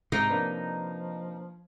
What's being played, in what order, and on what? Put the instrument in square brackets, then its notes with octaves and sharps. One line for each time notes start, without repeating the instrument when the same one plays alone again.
[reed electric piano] G#2 [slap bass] C3 [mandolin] D#4
[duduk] F3 [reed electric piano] A#3 D4 B4